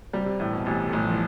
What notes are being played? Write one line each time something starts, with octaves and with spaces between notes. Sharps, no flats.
C3 G3
C3
A2 E3
B2
A1 C3
A3
A1 G3
F3
E3